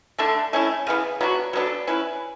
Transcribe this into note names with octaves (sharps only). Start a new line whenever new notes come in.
D3 A3 D4 A4
A3 C#4 E4
C#3 E3 B3
F#3 B3 D4 F#4
F#3 B3 D4 A4
C#4 E4 B4